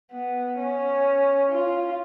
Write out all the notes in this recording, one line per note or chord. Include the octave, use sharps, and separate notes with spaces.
B3
C#4
F4